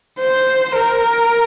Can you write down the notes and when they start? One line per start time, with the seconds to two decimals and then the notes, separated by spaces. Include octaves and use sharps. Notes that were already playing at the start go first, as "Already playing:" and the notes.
0.19 C5
0.75 A#4